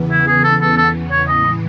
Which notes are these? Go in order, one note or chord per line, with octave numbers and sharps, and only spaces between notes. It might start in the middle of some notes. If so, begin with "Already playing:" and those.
Already playing: E2 C#3 E3 B3
E4
G#4
A4
A4
A4
C#5
A2 E3 G#3 D#5